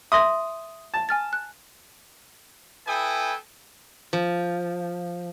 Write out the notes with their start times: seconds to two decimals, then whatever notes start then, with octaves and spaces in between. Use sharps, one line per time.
0.12 E5 C6 D#6 A#6
0.94 A5
1.09 G#5 F6 A6
1.33 F#6
2.87 E4 A4 B4 G5 G#5 D#6
4.13 F3